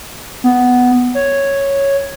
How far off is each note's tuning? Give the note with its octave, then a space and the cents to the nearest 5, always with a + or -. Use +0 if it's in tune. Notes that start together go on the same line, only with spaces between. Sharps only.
B3 +5
C#5 -5